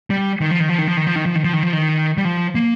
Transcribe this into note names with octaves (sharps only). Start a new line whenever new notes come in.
G3
D#3
F3
D#3
F3
D#3
F3
D#3
F3
D#3
F3
D#3
F3
D#3
F3
D#3
G3
F3
A#3